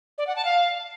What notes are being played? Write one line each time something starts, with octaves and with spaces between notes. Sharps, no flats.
D5
F#5
A5
F5